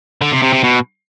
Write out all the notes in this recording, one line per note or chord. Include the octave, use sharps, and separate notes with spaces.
D3
C3
C3
C3
B2